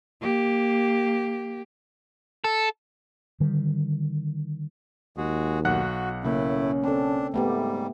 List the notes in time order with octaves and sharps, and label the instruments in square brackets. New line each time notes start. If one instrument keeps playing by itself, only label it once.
[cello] A#3 G4
[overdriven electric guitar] A4
[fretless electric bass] D3 D#3 G3
[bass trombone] D#2 [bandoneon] G#3 F#4 G#4
[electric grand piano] B1 F#5 F#6 [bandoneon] F#4
[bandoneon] A2 A3 E4 [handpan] C#3 A#3 [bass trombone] C#4
[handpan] C4 A4 [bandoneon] D4
[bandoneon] G#2 G3 [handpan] A3 B3 G4